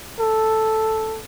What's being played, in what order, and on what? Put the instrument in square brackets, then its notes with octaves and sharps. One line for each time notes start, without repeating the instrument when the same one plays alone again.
[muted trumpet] A4